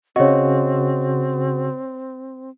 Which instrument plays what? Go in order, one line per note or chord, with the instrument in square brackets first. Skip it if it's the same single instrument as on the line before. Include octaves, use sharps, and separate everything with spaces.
[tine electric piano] C#3 F#4 [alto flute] C4 [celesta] C#5 D#5